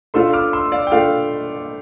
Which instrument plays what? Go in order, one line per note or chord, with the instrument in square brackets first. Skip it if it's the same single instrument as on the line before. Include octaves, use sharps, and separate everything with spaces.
[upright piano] A3 D4 F4 [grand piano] C6 E6
[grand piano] D6 F6
C6 E6
D5 F5
G5
[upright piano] A3 D4 F4 [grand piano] D5 F5